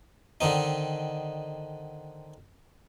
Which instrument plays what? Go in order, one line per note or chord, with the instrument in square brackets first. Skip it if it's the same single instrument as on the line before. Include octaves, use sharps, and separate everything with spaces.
[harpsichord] D3 D#3 C4 D#4